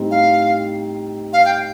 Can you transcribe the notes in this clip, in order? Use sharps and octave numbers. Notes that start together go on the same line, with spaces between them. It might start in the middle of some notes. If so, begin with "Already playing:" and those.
Already playing: A2 G3 C4 D#4
F5
F5
G5